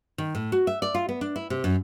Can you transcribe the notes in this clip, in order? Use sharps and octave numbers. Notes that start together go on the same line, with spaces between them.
D#3
A2
F#4
E5
D5
F4
B3
D4
E4
C3
F#2